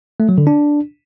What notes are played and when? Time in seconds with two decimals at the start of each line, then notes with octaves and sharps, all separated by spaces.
0.20 A3
0.29 F#3
0.38 D3
0.47 D4